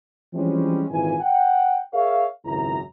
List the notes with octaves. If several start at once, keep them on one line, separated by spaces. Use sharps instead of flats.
E3 F3 G3 G#3 C4 C#4
G#1 A#2 E3 G#5
F#5 G5
G#4 A#4 C#5 E5 F5
G#1 C#2 F#2 C#3 E4 A#5